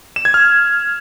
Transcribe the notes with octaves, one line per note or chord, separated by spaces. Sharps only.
E7
G#6
F6